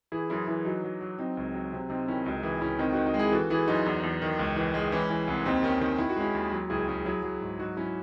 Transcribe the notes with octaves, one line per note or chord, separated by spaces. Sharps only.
E3 E4 G#4
F#2 E4 G#4
E3 E4 G#4
F#3 D#4 F#4
F#3
F#3
F#3 C4 D#4
C#2
F#3
C3
C3 C4 D#4
D#3 C#4 E4
C#2 D#4 F#4
E3 E4 G#4
C#2 C#4 E4
D#3 C4 D#4
D#3 D#4 F#4
D#4 F#4
G#3
E4 G#4
E3 F#4 A4
E3 E4 G#4
F#2 D#4 F#4
E2
E2
D#3
C#2
E3
G#3
E3 C#4 E4
E3
C2
D#2 C4 D#4
D#3 C#4
D#3
D#3 E4
F#4
G#3 C#4 E4
D#2
F#3
C#2 E4 G#4
C#2 C#4
F#3 E4 G#4
F#3
G#2
F#3 D#4 F#4
F#3 C#4 E4